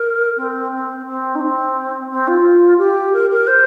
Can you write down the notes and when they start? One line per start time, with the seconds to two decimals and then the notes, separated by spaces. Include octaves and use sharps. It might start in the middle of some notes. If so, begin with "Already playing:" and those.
Already playing: A#4
0.37 C4
0.72 C4
1.06 C4
1.35 D#4
1.40 C4
2.10 C4
2.27 F4
2.78 G4
3.13 A#4
3.30 A#4
3.47 C5